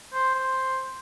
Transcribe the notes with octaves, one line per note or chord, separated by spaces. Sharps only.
C5
C5